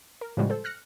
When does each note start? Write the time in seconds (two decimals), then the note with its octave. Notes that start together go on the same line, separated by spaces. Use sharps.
0.21 A#4
0.37 A2 C#3 F3 G3 G#3 F#4
0.50 A4 C5
0.64 F6 F#6 A#6 C#7